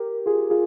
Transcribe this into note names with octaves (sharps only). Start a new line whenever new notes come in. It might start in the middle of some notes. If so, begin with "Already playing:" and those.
Already playing: G4 A#4
F4 G#4
F4 G#4